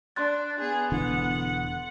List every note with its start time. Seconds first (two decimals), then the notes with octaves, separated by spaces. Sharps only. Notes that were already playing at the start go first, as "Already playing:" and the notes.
0.16 D4 C6 F#6 A6
0.60 B3 G#4
0.92 E1 D3 E3 F#5